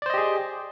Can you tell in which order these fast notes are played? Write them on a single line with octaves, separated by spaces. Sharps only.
D5 C5 D#5 G4 G#4